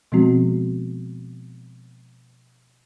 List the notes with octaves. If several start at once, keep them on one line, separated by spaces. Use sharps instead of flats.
B2 F3 G#3 B3 C4 F#4